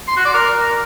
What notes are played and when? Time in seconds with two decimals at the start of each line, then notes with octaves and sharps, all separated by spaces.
0.08 C6
0.17 F#4
0.25 D5
0.34 A#4